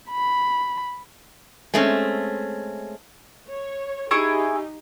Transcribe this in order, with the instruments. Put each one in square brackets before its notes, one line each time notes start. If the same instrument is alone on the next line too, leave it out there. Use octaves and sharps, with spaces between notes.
[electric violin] B5
[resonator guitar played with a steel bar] G#3 A3 C4 C#4
[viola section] C#5
[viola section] D#4 G4 [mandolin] E4 G#4 C#6